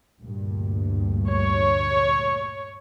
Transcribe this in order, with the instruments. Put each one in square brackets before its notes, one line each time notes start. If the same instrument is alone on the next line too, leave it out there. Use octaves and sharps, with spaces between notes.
[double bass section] D2 G2 A#2
[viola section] C#5